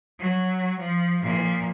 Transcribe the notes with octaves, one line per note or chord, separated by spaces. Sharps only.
F#3
F3
A#2 F3